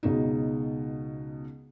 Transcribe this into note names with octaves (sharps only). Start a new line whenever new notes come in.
C#2 B2 D#4